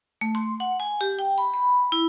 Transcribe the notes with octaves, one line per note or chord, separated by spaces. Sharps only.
A3
C6
F#5
G#5
G4
G5
B5
B5
E4